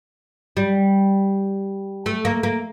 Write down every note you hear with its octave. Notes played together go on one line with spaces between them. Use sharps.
G3
A3
A#3
A#3